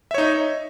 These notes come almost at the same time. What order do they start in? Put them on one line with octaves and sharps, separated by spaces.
E5 C#5 D#4